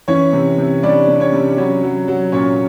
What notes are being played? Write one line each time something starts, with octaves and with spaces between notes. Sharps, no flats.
E3 C#4 C#5
C3
C3
G3 D4 D5
C3
C#4 C#5
C3
F#3 C#4 C#5
F#3
F#3
A#2 C#4 C#5